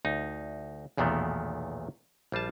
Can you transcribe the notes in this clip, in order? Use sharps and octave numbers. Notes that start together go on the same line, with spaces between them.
D2 D#4
B1 E2 A#2 D#3 A3 B3
A#1 G3 F4 A5